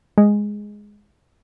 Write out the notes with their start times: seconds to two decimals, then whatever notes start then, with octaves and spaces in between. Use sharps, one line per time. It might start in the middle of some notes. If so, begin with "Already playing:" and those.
0.18 G#3